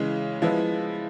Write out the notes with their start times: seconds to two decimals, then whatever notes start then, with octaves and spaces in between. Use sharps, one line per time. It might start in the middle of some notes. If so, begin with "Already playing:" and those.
Already playing: C#3 E3 G#3
0.42 F3 G#3 B3 E4